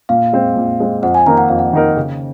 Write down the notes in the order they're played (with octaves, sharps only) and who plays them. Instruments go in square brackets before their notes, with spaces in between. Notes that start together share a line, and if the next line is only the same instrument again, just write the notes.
[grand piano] A#2 [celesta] F5
[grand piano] G#3 C4
A#2
G#3 C4
[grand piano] F2 [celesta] F#5
[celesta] G#5
[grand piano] D#3 A#3 D#4 A#4 [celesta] A#5
[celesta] F#5
[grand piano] F2 [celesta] F5
[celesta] F#5
[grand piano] D#3 A#3 D#4 A#4
C#3